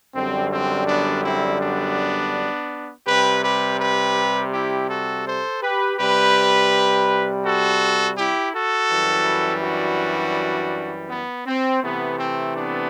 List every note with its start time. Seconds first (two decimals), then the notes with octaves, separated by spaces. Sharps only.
0.15 F#2 D3 G3 C4
0.52 C4
0.87 B3 D4
1.24 C4 E4
1.60 B3 D4
3.07 C3 G3 G4 B4
3.43 G4 B4
3.79 G4 B4
4.53 E4 G4
4.89 F#4 A4
5.26 A4 C5
5.62 G4 B4
5.99 C3 G3 G4 B4
7.44 F#4 A4
8.18 E4 G4
8.55 F#4 A4
8.91 F#2 E3 G3
9.63 D4 F#4
11.09 B3
11.47 C4
11.83 C3 E3 A3 B3
12.19 C4
12.56 B3 D4